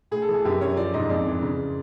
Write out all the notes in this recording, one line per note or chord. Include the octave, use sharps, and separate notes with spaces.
A2 G#4
A4
E3 G#4
F#2 G4
F#2 C#5
F3 D5
G#2 D#5
F2 D5
E3
C#3